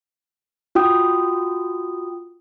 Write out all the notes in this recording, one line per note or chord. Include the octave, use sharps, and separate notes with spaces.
F4 F#4 G5 D#6